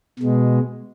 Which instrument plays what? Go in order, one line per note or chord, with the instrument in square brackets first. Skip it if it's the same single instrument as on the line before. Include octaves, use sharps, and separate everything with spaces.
[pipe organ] B2 G#3